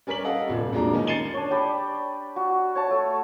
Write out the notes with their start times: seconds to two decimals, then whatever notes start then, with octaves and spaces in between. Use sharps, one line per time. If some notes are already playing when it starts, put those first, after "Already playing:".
0.07 G3 C#4 A#4 C#5 B6 F#7
0.24 A4 D#5 F5 F#5
0.47 F1 A#1 F2 G3
0.73 F2 F#3 G#3 A#3 D4 A#5
0.93 D#3 C#4 D#4
1.07 A6 C7 C#7 D#7 E7 G7
1.33 D4 C#5
1.51 G4 D5 B5
2.36 F#4
2.75 C#5 A5
2.91 A3